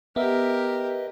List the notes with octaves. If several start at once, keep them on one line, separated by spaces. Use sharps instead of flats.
B3 G4 A#4 B4 D#5 E5